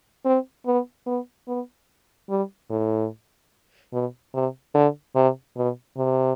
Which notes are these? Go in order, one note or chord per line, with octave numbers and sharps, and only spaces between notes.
C4
B3
B3
B3
G3
A2
B2
C3
D3
C3
B2
C3